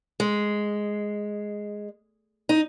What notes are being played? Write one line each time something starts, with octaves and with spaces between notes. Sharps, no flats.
G#3
D#4